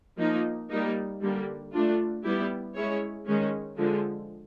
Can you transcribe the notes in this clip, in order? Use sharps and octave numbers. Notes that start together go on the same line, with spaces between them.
F3 A#3 D#4
G3 A#3 D#4
D3 G3 A#3
A3 D4 F4
G3 B3 E4 G4
G#3 C#4 E4 G#4 C#5
D#3 G#3 C#4
D3 F3 G#3